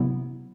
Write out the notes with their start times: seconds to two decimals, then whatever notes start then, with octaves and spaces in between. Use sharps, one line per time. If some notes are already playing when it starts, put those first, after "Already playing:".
Already playing: C3 F#3 B3 E4